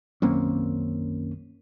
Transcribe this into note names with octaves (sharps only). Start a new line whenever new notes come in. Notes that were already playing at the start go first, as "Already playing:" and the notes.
B1 F#2 D#3 A#3 C4 C#4